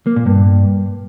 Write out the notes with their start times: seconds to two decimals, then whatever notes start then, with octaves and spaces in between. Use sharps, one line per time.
0.07 A#3
0.16 A#2
0.26 G2